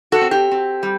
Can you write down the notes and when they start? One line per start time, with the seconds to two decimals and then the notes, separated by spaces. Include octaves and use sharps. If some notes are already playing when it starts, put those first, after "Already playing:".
0.12 F#4 A4
0.21 C4
0.31 G4
0.51 C4
0.83 G3